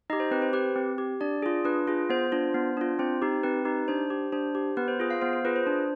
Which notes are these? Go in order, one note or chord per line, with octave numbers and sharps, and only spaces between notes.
D#4 G4 D#5
C5
C4 B4
C5
G4 B4
C4
G4
D4 D5
F4 G#4
D4 B4
F4 G#4
B3 C5
D4 F4
B3
D4 F4
C4 C5
D#4 G4
C4 B4
D#4 G4
D4 C5
G4
D4 C5
G4
B3 B4
C5
F4 G#4
F5
B3 C5
C5
F4 G#4 B4
C5
D4